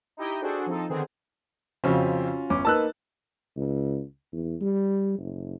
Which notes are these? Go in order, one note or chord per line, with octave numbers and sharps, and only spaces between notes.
D#4 E4 G4 D#5 G5
D4 F#4 G#4 A4 C5
F3 C4 D#4 A4
D3 D#3 B3 C4 G#4
F2 C#3 C4 C#4 F4 F#4
G1 C#4 D6
A#3 D#4 B4 A5 E6 F#6
C#2
E2
G3
F#1